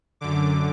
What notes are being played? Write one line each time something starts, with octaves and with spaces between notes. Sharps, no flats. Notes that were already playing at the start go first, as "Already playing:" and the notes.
F#2 D3 D6